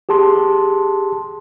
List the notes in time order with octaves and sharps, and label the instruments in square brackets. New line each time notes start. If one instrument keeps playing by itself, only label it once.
[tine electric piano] G4 G#4 A5 C6